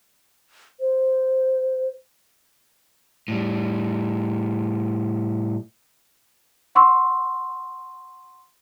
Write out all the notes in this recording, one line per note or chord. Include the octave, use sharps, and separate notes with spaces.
C5
A2 G3
F#5 C6 C#6 E6